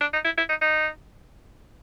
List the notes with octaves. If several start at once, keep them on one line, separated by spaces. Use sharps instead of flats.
D4
D#4
E4
E4
D#4
D#4